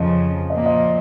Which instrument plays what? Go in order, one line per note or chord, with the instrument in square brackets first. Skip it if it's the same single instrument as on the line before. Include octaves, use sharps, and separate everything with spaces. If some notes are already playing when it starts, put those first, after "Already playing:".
Already playing: [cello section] F2 C#3 F3 [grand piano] D#5
[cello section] A#2 F3 A#3 [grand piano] D#5
[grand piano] D#5